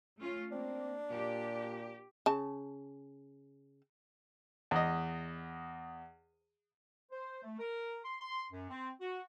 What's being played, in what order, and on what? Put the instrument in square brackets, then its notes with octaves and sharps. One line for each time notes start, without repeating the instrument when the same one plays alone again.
[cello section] A3 C#4 F4
[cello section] A#3 [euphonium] C4 [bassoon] D4
[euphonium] A#2 [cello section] G4
[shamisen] C#3 A5
[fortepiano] E2 D#5
[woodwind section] C5
A3
A#4
C6
C6
F#2
C4
F#4